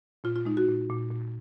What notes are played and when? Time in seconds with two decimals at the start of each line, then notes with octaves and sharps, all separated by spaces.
0.24 A#2 F4
0.36 F4
0.45 G#3 D#4
0.57 F#4
0.68 A#2
0.90 A#2
1.11 A#2